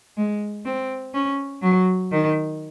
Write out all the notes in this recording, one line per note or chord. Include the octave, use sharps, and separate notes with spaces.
G#3
C4
C#4
F#3
D#3